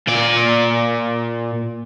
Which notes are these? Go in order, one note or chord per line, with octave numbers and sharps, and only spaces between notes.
A#2 D5